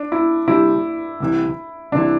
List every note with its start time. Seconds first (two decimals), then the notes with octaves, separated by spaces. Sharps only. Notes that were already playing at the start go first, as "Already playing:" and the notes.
Already playing: D4
0.12 E4
0.47 C3 G3 D4 E4
1.20 C2 C3 E3
1.92 C2 C3 E3 D4